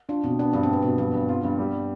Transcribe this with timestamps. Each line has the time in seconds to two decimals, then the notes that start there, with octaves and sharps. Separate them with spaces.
0.09 D4 F4
0.23 B2 C4
0.39 B3 D4
0.53 G2 D4
0.63 C4
0.69 B2 B3
0.82 B2 C4
0.98 G2 B3
1.14 G2
1.29 C4 F4
1.43 G2 D4
1.58 G3